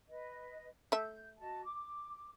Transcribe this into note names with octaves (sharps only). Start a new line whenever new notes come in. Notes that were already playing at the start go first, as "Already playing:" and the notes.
B4 D#5
A3 E5 G6
F#4 D#5 A5
D6